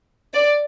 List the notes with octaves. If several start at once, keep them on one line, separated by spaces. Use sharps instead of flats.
D5